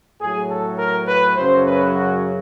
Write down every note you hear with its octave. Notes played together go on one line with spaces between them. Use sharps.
A2 F#3 G#4
A4
A#4
B4
F#2 C#3 F#3 C5
B4
F#4